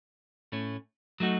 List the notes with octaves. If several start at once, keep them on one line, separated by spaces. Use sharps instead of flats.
A2 A3 C#4
F#3 A3 D#4 F#4